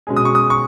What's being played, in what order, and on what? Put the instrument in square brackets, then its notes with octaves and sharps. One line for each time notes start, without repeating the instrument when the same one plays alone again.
[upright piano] B2 G#3 C#4 G#4
[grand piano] D#6
C#6
D#6
C#6